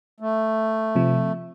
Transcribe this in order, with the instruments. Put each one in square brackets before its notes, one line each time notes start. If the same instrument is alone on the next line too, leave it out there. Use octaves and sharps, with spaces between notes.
[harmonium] A3
[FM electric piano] C3 F3